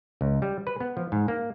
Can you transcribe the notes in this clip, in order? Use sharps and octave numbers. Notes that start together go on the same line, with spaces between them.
C#2
G3
B4
B3
F3
G#2
A#3